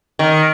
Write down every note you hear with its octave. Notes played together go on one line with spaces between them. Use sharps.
D#3